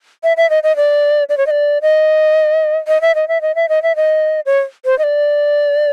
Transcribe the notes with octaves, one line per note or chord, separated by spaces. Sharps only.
E5
E5
D#5
D#5
D5
D5
C#5
D#5
D5
D#5
D#5
E5
D#5
E5
D#5
E5
D#5
E5
D#5
C#5
C5
D#5
D5